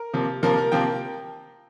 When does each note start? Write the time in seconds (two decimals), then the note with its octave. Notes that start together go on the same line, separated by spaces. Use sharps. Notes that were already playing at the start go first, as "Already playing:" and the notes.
Already playing: A#4
0.13 C3 F3 A#3
0.43 C3 F3 A#3 A#4
0.57 A#4
0.72 C3 F3 A#3 G5